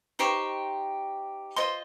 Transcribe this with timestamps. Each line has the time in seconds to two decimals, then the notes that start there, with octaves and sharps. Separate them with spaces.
0.19 D#4 G4 C5 C#6
1.56 F4 C5 D#5 C6